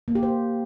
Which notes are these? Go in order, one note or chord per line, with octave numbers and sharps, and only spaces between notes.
A#3
G4
C5